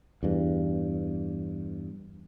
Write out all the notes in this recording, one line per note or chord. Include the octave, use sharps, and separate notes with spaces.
E2 G2